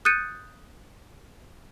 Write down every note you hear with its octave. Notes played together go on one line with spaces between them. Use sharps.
D#6 F#6 G6 A6 C#7 D#7